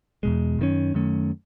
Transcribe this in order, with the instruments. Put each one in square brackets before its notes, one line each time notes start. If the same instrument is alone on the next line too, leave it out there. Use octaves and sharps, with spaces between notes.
[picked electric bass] E2 B2 G#3
F#2 D#3 A3 C#4
F#2 D#3 A3 C#4